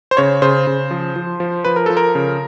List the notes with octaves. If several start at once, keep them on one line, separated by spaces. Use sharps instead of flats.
C5
C#3 C#5
C#3 C5
C#3
F3
F3
F3
F3 B4
A#4
F3 A4
A#4
C#3